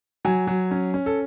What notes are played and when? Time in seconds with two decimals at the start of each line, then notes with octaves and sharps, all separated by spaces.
0.25 F#3 G#5
0.47 F#3
0.71 C#4
0.94 C#4
1.06 A4